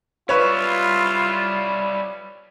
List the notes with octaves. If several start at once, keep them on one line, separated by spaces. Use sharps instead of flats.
G3 E4 F4 B4 C#5